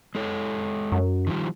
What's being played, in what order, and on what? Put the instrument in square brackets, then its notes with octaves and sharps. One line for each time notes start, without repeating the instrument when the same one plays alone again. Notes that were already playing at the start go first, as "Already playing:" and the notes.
[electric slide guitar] G#3 A4 C#5
[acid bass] F#2
[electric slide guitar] D#3 F3 G3